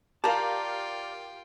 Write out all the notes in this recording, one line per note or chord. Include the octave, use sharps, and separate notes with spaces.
F4 G4 A#4 D5 F5 G5 A5 A#5